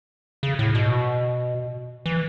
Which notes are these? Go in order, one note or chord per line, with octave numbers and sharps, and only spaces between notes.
C#3
A2
B2
E3